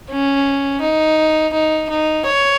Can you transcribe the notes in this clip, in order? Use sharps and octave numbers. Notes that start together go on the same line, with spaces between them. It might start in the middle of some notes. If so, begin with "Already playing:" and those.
C#4
D#4
D#4
D#4
C#5